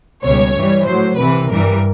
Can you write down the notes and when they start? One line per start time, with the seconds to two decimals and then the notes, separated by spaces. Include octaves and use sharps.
0.25 C#2 B2 G3 C#5
0.55 G2 E3 G3
0.87 A2 F#3 C5
1.18 C2 C3 E3 B4
1.49 G2 E3 G3 A#4